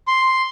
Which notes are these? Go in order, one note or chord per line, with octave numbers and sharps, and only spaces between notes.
C6